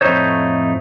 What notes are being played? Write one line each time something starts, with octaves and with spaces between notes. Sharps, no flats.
F2 A2 A3 D#4 C5 C#5